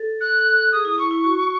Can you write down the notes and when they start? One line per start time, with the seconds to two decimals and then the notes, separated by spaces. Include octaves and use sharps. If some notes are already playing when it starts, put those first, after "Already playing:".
Already playing: A4
0.21 F#6
0.72 G#4 D#6
0.85 E4 D#6
0.98 E4 C#6
1.11 E4
1.24 F#4